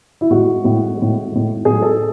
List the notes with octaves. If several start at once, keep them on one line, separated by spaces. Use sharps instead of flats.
E4
A2 G#3 F#4
A2 G#3
A2 G#3
A2 G#3
A2 F#3 A3 G#4
A4